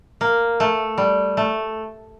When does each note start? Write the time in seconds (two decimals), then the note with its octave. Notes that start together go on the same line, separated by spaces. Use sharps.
0.21 A#3
0.60 A3
0.98 G3
1.37 A3